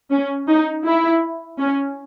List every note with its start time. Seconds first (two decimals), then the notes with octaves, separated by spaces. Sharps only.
0.11 C#4
0.48 D#4
0.86 E4
1.59 C#4